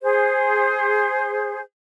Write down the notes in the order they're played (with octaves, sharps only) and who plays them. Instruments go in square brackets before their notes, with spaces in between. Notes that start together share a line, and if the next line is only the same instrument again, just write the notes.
[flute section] G#4 C5